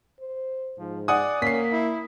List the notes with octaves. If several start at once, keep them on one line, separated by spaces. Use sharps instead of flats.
C5
G#2 F3
D5 F#5 G#5 D#6
A#3 C#4 B6 C7
E4